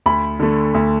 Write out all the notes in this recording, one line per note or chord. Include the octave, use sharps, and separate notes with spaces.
D2 B5
D3 A3
D2